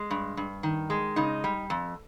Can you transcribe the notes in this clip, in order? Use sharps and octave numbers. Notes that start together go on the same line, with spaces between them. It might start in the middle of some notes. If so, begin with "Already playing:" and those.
Already playing: G#3
G2
G2
D#3
G#3
C#3 D#4
G3
F2